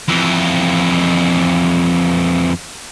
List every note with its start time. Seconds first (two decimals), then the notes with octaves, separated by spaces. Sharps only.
0.08 F2 E3